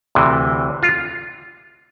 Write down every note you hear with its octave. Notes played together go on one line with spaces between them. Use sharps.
D2 C3 E3
F4